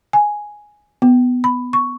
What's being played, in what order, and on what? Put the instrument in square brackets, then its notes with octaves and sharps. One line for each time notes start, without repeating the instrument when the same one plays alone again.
[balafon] G#5
B3
B5
C#6